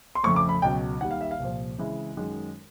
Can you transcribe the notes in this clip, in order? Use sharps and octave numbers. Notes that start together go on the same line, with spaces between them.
C6
F2 C#3 F3 A3 C#6
D6
B5
C#2 B2 F#3 G5
D#2 D#3 G3 F#5
F5
E5
F5
C2 A#2 F3
C#3 E3 G#3 C4 E4
F#2 D#3 G#3